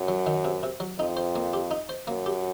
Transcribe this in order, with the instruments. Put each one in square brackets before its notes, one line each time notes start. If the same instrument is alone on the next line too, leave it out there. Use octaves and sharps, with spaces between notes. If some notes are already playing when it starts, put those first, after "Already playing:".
Already playing: [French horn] F#2
[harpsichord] F#3
D#3
C3
C3
F#3
[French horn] F2 [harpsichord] D#4
[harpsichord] C5
A#3
G4
D#4
C5
[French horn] F#2 [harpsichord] A#3
[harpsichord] G4